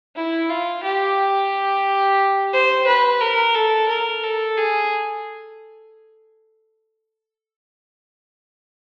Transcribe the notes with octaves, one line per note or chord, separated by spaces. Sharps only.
E4
F4
G4
C5
B4
A#4
A4
A#4
A4
G#4